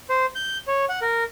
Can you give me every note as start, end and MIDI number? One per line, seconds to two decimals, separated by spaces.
0.10 0.26 72
0.35 0.58 91
0.68 0.85 73
0.89 1.00 78
1.02 1.24 70